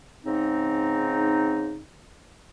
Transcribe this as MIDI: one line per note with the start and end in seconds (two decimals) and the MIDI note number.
0.25 1.80 44
0.25 1.80 49
0.25 1.80 60
0.25 1.80 63